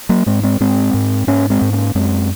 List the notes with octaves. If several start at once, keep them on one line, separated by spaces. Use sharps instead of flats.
F#3 A#3
G#2 G#3 C4
G#3 C4
G#2 G#3 C4
G#2
G#2 A#3 C#4
G#3 C4
G#2
A#3 C#4
F#2 G#3 C4